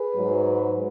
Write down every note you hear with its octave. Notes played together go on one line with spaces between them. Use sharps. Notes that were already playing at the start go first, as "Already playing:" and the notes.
Already playing: G#4 B4
G#2 F#3